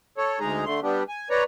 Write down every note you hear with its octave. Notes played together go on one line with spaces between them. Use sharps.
A4 C#5
D2 G#3 D#4 G#4 A#5
D3 A3 C6
G3 B3 D4 G4
G#5
B4 C#5 D5 A#5